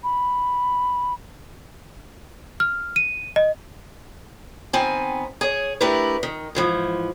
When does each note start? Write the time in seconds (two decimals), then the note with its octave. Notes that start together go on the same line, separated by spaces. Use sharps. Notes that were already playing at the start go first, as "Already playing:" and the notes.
0.04 B5
2.60 F6
2.96 D#7
3.36 D#5
4.73 D#3 B3 C4 G#5
5.41 G#4 C#5
5.81 A3 D4 E4 G4 A#4 B4
6.23 D#3
6.55 G#2 E3 F3